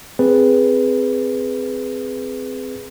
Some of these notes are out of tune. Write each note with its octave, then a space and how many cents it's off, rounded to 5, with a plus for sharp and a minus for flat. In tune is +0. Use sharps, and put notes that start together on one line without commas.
C4 -10 G#4 +0 B4 +0